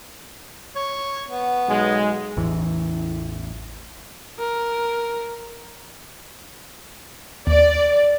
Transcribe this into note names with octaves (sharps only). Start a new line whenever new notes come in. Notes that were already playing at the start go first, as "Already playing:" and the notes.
C#5
B3
B1 G#3
A1 E2 E3
A#4
D#2 D5